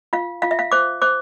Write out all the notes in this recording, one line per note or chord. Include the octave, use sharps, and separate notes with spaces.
F4 F5
F4 F5
E5
F5
C5 D6
C5 D6